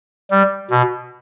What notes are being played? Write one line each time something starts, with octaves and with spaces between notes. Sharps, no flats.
G3
B2